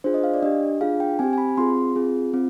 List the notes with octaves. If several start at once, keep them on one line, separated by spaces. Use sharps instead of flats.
D4 F4 G#4 C5
D#5
F5
D5
D4 G4 D#5
D4 F4 G#4 F5
G5
C4 G4 G#5
G#5
B5
C4 F4 G#4 C6
C4 F4 G#4
C4 F4